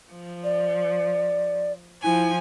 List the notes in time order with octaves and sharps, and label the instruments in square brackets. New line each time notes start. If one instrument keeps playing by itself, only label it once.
[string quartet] F3
[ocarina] D5
[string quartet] F3 G#5 [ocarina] E4